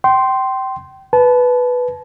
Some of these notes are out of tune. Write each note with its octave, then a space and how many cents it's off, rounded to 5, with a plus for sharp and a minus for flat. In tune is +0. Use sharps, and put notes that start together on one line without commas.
G5 -25 C6 +0
B4 +0 A5 -25